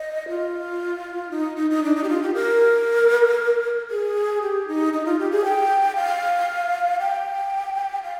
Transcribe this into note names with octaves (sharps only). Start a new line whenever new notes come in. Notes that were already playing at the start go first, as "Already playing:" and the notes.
Already playing: D#5
F4
D#4
D#4
D#4
D4
D#4
G4
F4
G4
A#4
G#4
G4
D#4
D#4
F4
G4
G#4
G5
F5
G5
F5